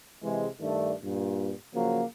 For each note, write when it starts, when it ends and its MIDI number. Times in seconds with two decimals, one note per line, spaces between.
0.23 0.47 48
0.23 0.47 52
0.23 0.47 56
0.60 0.93 43
0.60 0.93 51
0.60 0.93 57
0.60 0.93 62
1.03 1.52 43
1.03 1.52 46
1.73 2.02 49
1.73 2.02 53
1.73 2.02 54
1.73 2.02 58